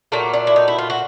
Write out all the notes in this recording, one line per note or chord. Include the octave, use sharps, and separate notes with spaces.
A#2 F#3 A3 A#3
D4
E4
D#4
E4
F4
F#4